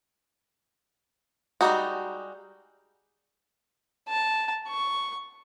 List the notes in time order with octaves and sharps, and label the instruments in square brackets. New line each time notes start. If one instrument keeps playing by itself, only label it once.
[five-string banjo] G3 G#3 A#3 D#4 F#4
[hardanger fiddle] A5
C#6